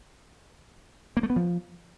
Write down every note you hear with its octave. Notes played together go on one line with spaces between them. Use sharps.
A#3
A3
B3
F3